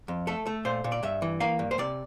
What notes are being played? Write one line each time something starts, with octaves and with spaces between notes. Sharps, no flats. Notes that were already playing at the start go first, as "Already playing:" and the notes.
F2
A3 A4
A3
A#2 C5
A#2
D5
G2 E5
E3
A#3 F5
G2
C5
C3 D5